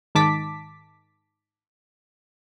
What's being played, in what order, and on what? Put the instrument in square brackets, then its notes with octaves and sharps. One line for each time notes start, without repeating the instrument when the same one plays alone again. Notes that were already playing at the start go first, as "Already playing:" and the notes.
[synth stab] G#2 D#3 A5 D6 B6